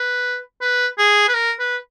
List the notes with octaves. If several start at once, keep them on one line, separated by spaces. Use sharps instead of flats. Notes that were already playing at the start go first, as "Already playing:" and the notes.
Already playing: B4
B4
G#4
B4
A#4
B4